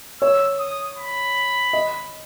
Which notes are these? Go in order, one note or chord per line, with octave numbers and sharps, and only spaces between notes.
C#5 E6
D#6
B5
D#5